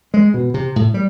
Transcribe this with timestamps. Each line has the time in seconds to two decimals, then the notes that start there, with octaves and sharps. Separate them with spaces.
0.14 G#3
0.34 B2
0.54 C3
0.76 A2
0.94 G3